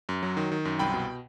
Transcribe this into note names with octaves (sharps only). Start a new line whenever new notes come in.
F#2
F#3
D#3
D#3
F#2
C2 G5 B5
B2